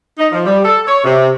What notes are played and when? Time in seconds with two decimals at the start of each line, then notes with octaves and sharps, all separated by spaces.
0.18 D#4
0.32 F3
0.46 G3
0.65 A4
0.87 C#5
1.04 C3